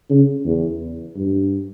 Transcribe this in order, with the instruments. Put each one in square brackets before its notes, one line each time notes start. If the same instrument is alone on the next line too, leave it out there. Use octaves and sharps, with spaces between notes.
[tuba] C#3
E2
G2